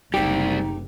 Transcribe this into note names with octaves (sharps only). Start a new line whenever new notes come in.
F#1 D2 C3 G3 C4 D#4 G4